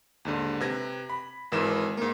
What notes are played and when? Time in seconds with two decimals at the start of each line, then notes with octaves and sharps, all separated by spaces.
0.25 D#2 G#2 D3
0.61 C3 B4 G#6 A#6
1.10 B5
1.52 G#1 G#2 E3 A#4 E7
1.97 G#2 A#3